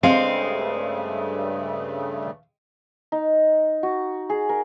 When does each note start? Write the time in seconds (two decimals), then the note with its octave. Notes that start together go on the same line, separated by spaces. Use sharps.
0.03 G2 C#3 G#3 A3 C4 F5
3.12 D#4
3.83 F#4
4.30 G#4
4.49 A#4